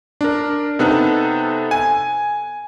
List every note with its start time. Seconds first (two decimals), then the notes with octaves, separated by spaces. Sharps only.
0.21 D4 A#4
0.79 C3 B3 D#4 A4 F#6
1.71 G#5